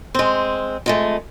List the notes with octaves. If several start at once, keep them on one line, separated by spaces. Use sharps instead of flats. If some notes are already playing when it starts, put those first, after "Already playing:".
G#3 C4
F2 G#3 A3